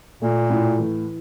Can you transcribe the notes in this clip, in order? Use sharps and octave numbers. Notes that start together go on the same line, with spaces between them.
A#2 A3
A2
E3